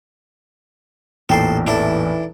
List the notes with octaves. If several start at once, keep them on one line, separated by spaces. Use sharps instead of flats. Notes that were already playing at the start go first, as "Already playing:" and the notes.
A1 E2 A#2 D#4 A4 C5 G5 C6
E3 D4 E4 A4